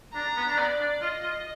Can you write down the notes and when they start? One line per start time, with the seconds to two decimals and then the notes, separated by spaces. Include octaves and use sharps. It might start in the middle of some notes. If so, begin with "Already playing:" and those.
0.14 D4 A#5
0.36 B3
0.48 D4
0.58 B3 D5
0.80 D4
1.02 F4 D#5
1.23 F4